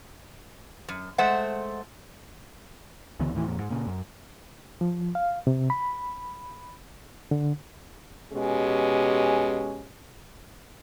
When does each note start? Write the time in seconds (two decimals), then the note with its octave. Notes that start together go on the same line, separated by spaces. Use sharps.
0.89 F#2
1.18 G#3 A3 C5 E5 F#5
3.20 C#2 D3 E3 B3
3.34 D#2 A2 C#3 E3
3.46 F2 A#2
3.59 G#2
3.71 A#2 C#3
3.87 F#2
4.81 F3
5.15 F5
5.47 C3
5.70 B5
7.31 D3
8.32 B2 G#3 C#4 G4